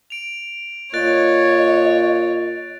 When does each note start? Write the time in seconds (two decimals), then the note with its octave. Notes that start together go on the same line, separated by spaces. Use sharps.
0.10 D7 F7
0.94 A#2 C#5 D#5 F#6 A6 D7